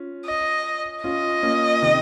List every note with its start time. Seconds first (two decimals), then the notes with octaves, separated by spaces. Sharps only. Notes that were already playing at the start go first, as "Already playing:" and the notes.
Already playing: C#4 F4
0.26 D#5
1.04 C#4 F4 D#5
1.43 A#3 C#4
1.82 C3 D#3